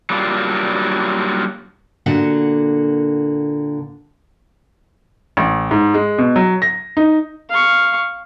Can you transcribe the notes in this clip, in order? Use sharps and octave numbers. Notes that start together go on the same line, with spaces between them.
F#3 G3 A#3 D4 F4
A#2 D3 F#4 F#5
A1
G#2
G#3
B2
F#3
A#6
D#4
F5 C#6